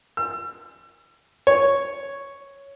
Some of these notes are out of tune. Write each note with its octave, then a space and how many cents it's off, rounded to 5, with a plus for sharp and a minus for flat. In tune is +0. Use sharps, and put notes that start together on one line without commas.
E6 +40
C#5 +0